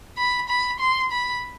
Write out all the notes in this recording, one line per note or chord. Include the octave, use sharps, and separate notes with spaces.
B5
B5
C6
B5